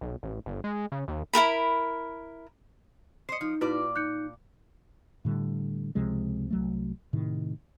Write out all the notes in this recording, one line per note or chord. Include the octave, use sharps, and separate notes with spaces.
B1
A1
G1
G#3
C#3
D#2
E4 F#4 A#4 B5
C5 D#5 C7 C#7
F3 D#4
A#2 E4 F#4 B4 D5
D#4 F#6 G6 C#7
A2 D3 G3
C#2 C3 F3 G#3
C2 F#3 A3
A2 C3 D#3